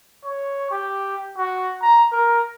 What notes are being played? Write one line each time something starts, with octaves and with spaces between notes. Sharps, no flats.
C#5
G4
F#4
A#5
A#4